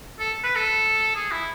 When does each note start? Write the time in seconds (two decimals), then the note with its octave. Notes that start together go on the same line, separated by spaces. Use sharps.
0.19 A4
0.44 B4
0.55 A4
1.16 G#4
1.32 E4